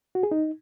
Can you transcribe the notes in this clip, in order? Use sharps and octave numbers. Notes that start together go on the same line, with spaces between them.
F#4
G#4
D#4